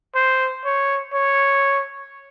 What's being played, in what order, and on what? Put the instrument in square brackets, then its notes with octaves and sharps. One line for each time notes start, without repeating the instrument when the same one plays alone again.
[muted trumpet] C5
C#5
C#5